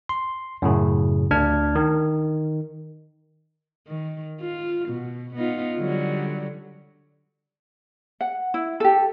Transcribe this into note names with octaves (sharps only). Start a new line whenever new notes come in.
C6
F#2 A2 C#3
D2 D4 A5 F6 G#6
D#3
D#3
F4
B2
B3 D#4 F4
D3 F#3 G3
F#5
E4
G4 A4